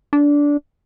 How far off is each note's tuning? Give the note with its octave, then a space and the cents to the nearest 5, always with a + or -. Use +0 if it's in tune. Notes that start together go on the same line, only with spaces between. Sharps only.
D4 -15